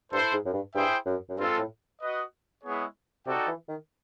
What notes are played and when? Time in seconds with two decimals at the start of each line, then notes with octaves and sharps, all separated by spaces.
0.11 G2 E4 A4 C5
0.33 G#2
0.45 F#2
0.53 G2
0.75 G2 E4 G#4 C5 E5 G5
1.06 F#2
1.29 F#2
1.37 G2 G#3 C4 F4 A4
1.59 A2
2.01 F#4 B4 D#5
2.63 G#3 B3 E4 G#4 C#5
3.26 C3 D#4 F#4 A4 D5 G5
3.48 E3
3.69 D#3